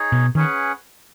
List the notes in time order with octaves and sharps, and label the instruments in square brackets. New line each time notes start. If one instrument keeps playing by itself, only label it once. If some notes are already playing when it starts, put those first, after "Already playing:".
Already playing: [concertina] D#4 G#4 C#5
[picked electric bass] B2
[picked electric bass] D#3 [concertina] C#4 G#4 B4 F#5